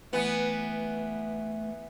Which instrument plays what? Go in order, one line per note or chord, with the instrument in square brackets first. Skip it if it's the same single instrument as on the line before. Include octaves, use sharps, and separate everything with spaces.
[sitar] E3 B3 [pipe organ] A3